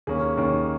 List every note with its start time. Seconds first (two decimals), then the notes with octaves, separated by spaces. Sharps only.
0.07 D#2 D#3 A#3 C#4 G#4
0.37 D#2 D#3 A#3 C#4